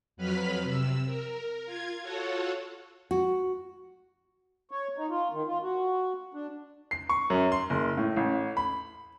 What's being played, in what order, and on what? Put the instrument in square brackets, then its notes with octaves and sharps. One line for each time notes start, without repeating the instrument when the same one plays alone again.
[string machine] F2 F#3 B4 B5 F6 B6
C3 E6
A#4
F4 G#6
F4 F#4 A4 C#5 F#5
[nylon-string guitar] F#4
[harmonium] C#5
D#4
F4
D#3
F4
F#4
D4
[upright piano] C7
C#6
F#2
C6
F#1
A2
A1
B5